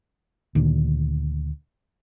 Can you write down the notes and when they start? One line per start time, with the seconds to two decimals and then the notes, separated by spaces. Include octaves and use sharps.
0.55 D2 A#2 D#3 D4